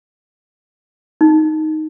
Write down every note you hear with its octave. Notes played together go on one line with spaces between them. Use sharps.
D#4